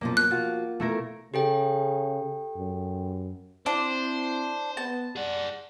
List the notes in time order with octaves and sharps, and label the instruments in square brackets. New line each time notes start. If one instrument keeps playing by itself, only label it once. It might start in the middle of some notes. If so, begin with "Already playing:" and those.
[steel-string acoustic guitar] F#2 B2 F3 [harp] A#3
[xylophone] F#6
[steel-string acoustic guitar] F3 F#4 [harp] F4
[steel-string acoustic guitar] B2 [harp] A3 E4 A#4
[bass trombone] C#3 [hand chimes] G4 A4 G5
[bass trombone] F#2
[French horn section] C4 E4 [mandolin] D4 [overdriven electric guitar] C5
[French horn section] B3 [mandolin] A5
[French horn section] G3 D5 [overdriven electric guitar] G#4 F#5